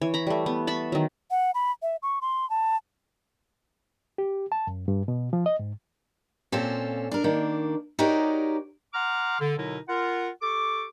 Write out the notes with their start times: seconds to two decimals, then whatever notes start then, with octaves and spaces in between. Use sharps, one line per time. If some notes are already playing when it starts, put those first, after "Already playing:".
0.01 E3 C#5
0.14 A#5 B5
0.27 G3 A3
0.46 B3
0.67 A5 B5 C#6
0.92 D#3 F#3
1.31 F#5
1.54 B5
1.82 E5
2.03 C#6
2.21 C6
2.50 A5
4.18 G4
4.52 A5
4.67 F#2
4.88 G2
5.08 B2
5.33 F3
5.46 D#5
5.59 G#2
6.52 A#2 C4 C#4 F4 A4
7.11 D4 A#4
7.24 D#3 A#3 D4
7.99 D#4 F#4 G4 A#4 C#5 D5
8.93 F#5 A#5 C6 D6 F6
9.39 D3
9.57 B2 D3 F#3 D#4 E4 A#4
9.88 F4 A#4 F#5
10.42 G4 A4 C#6 D6